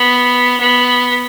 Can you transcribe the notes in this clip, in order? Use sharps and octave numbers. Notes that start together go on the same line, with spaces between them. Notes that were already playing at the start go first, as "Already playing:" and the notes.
Already playing: B3
B3